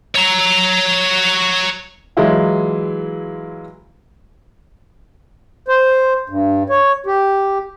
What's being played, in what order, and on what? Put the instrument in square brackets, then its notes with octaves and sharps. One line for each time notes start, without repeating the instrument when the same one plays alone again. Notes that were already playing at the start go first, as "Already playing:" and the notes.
[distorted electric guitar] C#5 A#5
[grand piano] E3 F#3 G#3 E4 F4
[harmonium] C5
G2
C#5
G4